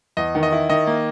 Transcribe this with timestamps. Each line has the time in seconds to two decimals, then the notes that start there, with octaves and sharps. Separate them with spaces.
0.17 E2 D#5
0.35 D#3
0.43 D#5
0.52 E4
0.69 D#3 D#5
0.87 A#3